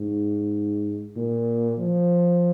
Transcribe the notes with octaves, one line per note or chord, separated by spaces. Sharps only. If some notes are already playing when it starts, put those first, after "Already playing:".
Already playing: G#2
A#2
F3